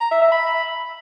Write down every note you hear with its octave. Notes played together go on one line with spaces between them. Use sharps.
A#5
E5
E5
B5